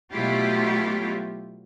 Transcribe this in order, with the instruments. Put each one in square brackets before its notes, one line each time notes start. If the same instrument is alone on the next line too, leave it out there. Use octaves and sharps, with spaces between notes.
[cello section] B2 F#3 A3 E4 F4 G4